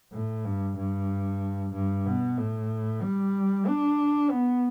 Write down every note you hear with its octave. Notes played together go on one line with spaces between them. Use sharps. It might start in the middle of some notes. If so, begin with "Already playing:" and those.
A2
G2
G2
G2
B2
A2
G3
D4
B3